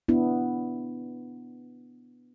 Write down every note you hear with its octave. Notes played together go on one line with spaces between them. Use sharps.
B3 D4 E4